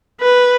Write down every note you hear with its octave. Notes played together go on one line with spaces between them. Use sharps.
B4